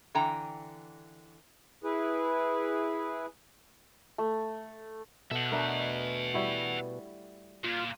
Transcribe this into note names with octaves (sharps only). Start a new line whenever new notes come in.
D3 E3 G5 A#5
E4 G#4 B4
A3
B2 A4 E5 F#5
A3 D4 A#4
G3 E4 F#4
A#2 F4